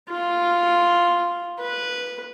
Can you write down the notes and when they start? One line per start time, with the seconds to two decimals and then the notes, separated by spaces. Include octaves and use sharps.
0.11 F4
1.60 B4